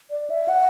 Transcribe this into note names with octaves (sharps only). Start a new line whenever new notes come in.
D5
E5
F#5